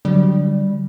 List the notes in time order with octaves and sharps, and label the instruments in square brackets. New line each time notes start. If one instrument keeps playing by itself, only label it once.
[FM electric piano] D3 F#3 [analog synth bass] G3